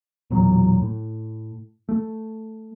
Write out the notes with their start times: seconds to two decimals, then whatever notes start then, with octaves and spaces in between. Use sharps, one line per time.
0.30 E1 E2 A#2 F#3
0.81 A2
1.89 A3